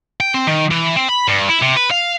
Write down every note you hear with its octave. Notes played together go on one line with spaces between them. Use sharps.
G5
C4
D#3
E3
C4
B5
G2
E4
C3
B4
F5